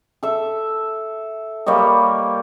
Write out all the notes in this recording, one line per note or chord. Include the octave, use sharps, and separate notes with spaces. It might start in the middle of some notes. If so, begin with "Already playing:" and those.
A4 E5
G3 A#3 C#5 D#5